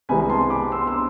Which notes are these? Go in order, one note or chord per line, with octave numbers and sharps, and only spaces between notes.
C2 C3 E3 G#3 G#5 B5
A5 C6
B5 D6
C6 E6
C6 E6